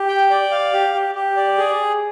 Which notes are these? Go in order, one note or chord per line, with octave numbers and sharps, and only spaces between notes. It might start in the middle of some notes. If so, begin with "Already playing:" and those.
Already playing: G4
G5
D5
F5
G4
G4
G4
D5
G#4